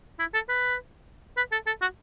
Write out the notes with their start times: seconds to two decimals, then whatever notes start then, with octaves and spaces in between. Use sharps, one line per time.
0.19 E4
0.34 A4
0.49 B4
1.37 B4
1.52 A4
1.67 A4
1.82 F#4